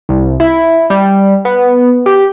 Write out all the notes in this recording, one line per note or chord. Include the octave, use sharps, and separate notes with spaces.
C2
E4
G3
B3
G4